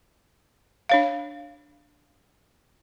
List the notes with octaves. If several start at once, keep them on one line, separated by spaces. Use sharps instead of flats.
D4 C#5 F5